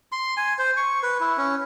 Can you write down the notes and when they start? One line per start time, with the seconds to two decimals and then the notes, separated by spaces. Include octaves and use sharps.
0.12 C6
0.37 G#5
0.59 C5
0.77 C#6
1.03 B4
1.20 E4
1.37 C#4